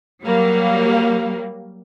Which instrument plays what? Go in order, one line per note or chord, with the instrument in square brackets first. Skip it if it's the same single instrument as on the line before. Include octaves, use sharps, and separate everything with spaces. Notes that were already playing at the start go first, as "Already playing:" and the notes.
[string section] F#3 G3 A#3